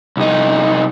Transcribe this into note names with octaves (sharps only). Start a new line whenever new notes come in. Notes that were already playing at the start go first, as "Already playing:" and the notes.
C2 D#4